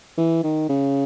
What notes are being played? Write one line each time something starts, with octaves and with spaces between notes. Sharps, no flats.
E3
D#3
C#3